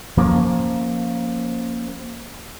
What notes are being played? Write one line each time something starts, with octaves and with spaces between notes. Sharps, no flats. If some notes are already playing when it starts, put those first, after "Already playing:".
F3 A#3 C#4